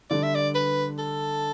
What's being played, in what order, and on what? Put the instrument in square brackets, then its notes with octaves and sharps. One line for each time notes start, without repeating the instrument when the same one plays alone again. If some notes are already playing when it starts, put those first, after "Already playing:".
[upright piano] D3 G3 D4 [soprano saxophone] D5
[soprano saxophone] E5
D5
B4
A4